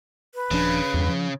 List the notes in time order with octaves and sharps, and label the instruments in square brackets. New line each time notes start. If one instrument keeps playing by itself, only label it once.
[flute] B4
[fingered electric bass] D#1 F3 D4 [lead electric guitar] C#3
[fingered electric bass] E2 G2
F3